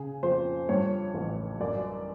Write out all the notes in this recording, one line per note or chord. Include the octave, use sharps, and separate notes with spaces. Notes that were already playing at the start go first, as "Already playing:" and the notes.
Already playing: C#3 G#4
F2 C5
G2 C#5
A1
F#2 D5